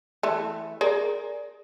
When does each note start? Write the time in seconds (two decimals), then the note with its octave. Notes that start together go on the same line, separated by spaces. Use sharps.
0.23 E3 A3
0.81 G#4 A#4 D5